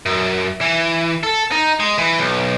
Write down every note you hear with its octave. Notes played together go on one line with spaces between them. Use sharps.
F#2
E3
A4
D#4
G#3
E3
B1